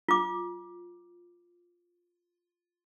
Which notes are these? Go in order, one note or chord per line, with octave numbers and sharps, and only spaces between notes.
F4 D6